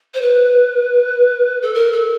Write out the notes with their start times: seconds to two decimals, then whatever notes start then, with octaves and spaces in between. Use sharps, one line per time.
0.14 C5
0.21 B4
1.62 A4
1.74 A#4
1.93 A4